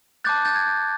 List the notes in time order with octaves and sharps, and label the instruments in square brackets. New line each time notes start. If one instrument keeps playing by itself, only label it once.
[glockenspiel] A5 D6 F#6 G6 A6
G6 A6
G#6
G6